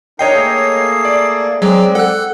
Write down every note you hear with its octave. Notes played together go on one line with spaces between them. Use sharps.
D4 D#4 A#4 C#5 D#5 G5 C7
A3 A#3 G#4
D5
F#3 G#3 C4 D5
A4 F#5 F#6